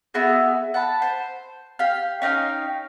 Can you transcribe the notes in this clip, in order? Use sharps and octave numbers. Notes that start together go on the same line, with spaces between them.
B3 E4 F#4 G#4
F#5 A5 B5
C5
G4 F5
C#4 D#4 F5 G5